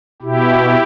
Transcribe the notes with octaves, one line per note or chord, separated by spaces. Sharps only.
B2 E4 G4